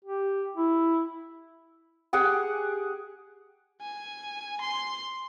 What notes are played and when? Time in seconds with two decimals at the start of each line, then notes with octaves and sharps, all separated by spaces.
0.05 G4
0.56 E4
2.13 G4 G#4 F#5
3.81 G#5
4.61 C6